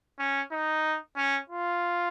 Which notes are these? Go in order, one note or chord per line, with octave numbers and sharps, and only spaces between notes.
C#4
D#4
C#4
F4